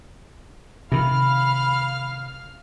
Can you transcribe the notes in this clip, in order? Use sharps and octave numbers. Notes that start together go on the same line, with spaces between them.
C3 D#3 F5 B5 F6